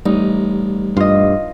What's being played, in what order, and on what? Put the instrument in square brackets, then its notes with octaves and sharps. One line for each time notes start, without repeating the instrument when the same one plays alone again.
[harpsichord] A1 [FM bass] G3 [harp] D#4
[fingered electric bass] G2 [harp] F4 D#5